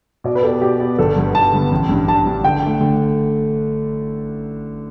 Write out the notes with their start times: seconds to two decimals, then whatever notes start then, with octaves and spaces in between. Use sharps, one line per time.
0.24 B2 D5
0.35 B4
0.43 B3 G4 A4 D5
0.61 B2 G4
0.80 B3 G4 D5
0.99 G1 A4
1.16 G2 D3 G3 B3
1.34 G1 A5
1.52 G2 D3 G3 B3
1.71 A1
1.89 G2 G3 D4
2.08 A1 A5
2.26 G2 G3 D4
2.44 D3 G5
2.62 A3 D4
2.81 D3